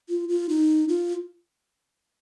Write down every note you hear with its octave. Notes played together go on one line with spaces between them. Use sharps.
F4
F4
D#4
F4